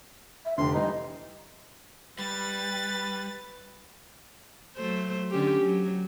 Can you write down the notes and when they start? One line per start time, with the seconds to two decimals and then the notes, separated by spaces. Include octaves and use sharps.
0.45 E5
0.58 F1 D3 D4 G4 C6
0.74 E3 G3 D#4 D#5
2.19 G3 B4 A6
4.77 F#3 A3 C5
5.31 D3 C#4 G4
5.62 F#3